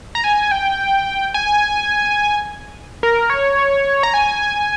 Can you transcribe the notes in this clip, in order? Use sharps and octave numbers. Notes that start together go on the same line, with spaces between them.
A#5
G#5
G5
G#5
A#4
C#5
A#5
G#5